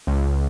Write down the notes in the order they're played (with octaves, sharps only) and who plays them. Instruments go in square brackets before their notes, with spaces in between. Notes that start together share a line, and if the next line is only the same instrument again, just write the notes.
[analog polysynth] C#2